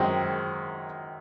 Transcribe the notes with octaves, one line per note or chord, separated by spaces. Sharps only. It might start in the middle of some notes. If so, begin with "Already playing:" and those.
Already playing: F#2 D#3 G#3 C4